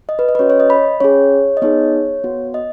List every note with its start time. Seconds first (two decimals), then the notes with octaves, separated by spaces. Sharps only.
0.09 D#5
0.19 B4
0.29 D#5
0.35 B4
0.39 C#4 F#4 C#5
0.50 C#5
0.60 D#5
0.70 B5
1.00 C#4 G#4 C#5
1.57 D#5
1.62 B3 D#4 G#4 C#5
2.24 B3 F#4
2.54 D#5